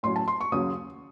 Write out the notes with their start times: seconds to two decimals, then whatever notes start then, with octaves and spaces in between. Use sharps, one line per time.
0.03 A2 F#3 C#4 C6
0.16 A5
0.28 C6
0.41 C#6
0.52 D#2 C#3 F#3 C#4 D#6